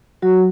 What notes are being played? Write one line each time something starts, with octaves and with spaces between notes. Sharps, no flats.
F#3 F#4